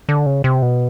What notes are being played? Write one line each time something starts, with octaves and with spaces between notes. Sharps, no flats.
D3
C#3
C3
B2